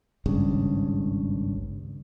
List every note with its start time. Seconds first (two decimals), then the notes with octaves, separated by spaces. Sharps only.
0.26 G#1 C#2 G2 C#3